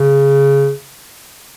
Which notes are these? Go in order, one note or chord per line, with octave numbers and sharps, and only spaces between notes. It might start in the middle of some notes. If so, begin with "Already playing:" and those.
Already playing: C#3